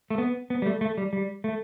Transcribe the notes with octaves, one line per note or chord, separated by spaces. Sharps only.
A3
B3
B3
G3
A3
A3
G3
G3
A3